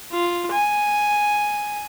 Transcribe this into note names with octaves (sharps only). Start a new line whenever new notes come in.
F4
G#5